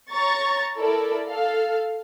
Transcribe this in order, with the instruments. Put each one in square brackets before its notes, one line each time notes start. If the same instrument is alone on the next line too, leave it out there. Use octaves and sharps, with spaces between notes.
[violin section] C#5 A#5 C#6 A6
E4 A4 A#4 D5
A4 F5